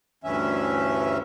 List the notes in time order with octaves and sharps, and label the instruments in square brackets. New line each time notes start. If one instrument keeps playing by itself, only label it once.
[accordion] D2 G2 E3 C#4 E5